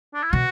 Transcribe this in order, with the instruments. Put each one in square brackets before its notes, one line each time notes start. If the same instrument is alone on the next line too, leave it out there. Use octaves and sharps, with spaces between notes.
[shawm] D4
E4
[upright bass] B2 [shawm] F#4